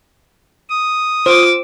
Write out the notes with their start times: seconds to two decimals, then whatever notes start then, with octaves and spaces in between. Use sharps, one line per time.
0.70 D#6
1.26 F4 C5 D6 E6